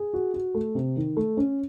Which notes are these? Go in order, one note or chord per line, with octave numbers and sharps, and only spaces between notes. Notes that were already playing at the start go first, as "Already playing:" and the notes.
Already playing: G#4
F#4
F#4
A3
C3
D#3
A3
C#4